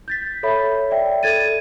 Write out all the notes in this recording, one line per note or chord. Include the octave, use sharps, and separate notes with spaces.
G6 A6 B6
A4 C#5 E5 B5
D5 E5 G5
A4 G#6 A6 D#7